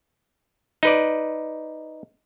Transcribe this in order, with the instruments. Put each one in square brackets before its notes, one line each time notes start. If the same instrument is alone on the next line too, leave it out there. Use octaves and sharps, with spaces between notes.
[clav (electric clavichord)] D#4 B4 D5